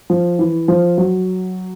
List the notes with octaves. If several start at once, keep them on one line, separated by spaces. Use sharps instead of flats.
F3
E3
F3
F#3